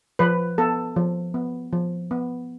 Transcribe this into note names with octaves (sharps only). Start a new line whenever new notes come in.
F3 B4
B3 A4
F3
B3
F3
B3